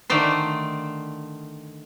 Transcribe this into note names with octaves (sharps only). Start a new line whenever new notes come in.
D3 D#3 A3 C5